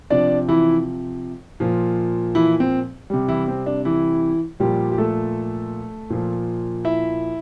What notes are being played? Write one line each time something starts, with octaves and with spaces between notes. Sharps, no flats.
C3 F3 D4 D5
E3 E4
A#2 F3
E3 E4
C4
C3 G3
E3 E4
C4
D4
E3 E4
A#2 F3 G3 G4
G4
A3 A4
A#2 F3
E4 E5